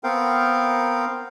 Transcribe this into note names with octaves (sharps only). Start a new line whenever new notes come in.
B3 C4 A#4 F5 G5